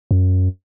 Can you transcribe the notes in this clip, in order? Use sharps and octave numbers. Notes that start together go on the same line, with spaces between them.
F#2